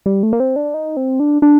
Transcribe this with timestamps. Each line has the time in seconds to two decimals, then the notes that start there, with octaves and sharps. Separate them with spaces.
0.06 G3
0.23 A3
0.33 A#3
0.40 C4
0.56 D4
0.74 D#4
0.97 C4
1.20 D4
1.42 D4